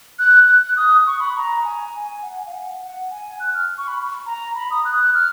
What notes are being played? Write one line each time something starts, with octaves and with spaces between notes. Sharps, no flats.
F#6
F#6
F#6
D#6
C#6
B5
A#5
G#5
G#5
F#5
G#5
F5
F#5
F#5
G#5
F#6
F6
C#6
B5
A#5
B5
D#6
F#6
F#6
F6